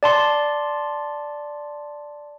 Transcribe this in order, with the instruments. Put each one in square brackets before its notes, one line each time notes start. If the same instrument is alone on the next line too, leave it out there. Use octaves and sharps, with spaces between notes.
[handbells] D5 A5 C6